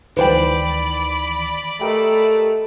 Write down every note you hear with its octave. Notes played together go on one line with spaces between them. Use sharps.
D2 D#3 E3 B4 C5 D5 G5 B5
A3 G4 A#4 D#5